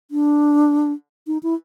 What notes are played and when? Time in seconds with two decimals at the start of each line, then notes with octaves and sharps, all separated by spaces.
0.11 D4
1.27 D#4
1.43 E4